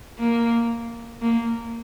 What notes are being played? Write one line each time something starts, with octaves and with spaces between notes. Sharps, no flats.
A#3
A#3